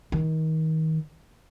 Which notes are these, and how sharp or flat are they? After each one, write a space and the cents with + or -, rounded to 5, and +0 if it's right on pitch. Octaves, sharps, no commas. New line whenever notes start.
D#3 +30